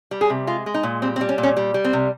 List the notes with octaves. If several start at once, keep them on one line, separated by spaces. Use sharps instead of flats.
G3
G#4
C3
G#3 F4
G#3
D#4
A#2
G3 C4
C4
G3
C#4
A#2
C#4
G3
G3
C4
C3